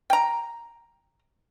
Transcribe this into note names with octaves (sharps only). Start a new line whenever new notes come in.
G5 A#5